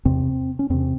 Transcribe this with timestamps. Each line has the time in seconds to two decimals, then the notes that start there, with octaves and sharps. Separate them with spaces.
0.05 E2 C3 C4
0.59 C#4
0.70 E2 C3 C4